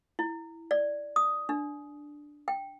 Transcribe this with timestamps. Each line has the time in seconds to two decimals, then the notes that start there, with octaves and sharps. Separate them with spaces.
0.19 E4
0.71 D5
1.16 D#6
1.49 D4
2.48 G5